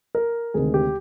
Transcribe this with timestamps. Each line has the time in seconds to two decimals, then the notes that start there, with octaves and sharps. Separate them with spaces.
0.15 A#4
0.54 D2 C3 D#3 G#3 G#4
0.74 G4